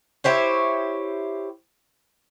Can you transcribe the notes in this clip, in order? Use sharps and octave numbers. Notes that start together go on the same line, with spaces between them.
E4 G4 C5 C#5